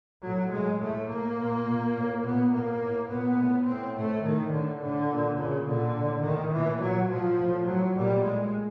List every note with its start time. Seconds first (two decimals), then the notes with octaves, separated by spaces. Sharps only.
0.25 A2 F#3
0.53 A2 G#3
0.81 A2 A3
1.10 A2 A#3
1.39 A#2
1.67 A#2
1.97 A2
2.24 A#2 B3
2.53 A2 A#3
2.82 A2
3.11 A#2 B3
3.40 A2
3.68 A2 C4
3.97 A2 A3
4.25 A2 D#3
4.54 A2 D3
4.82 A2 D3
5.11 A#2
5.40 A#2 C#3
5.68 A#2 D3
5.97 A2
6.26 A2 D#3
6.55 A#2 E3
6.83 A#2 F#3
7.12 A2 F3
7.40 A2
7.69 A2 F#3
7.97 A#2 G3
8.26 A2 G#3